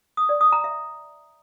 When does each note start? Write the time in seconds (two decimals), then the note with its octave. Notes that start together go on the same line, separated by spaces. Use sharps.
0.17 D#6
0.29 D5
0.41 D#6
0.52 A#5
0.64 E5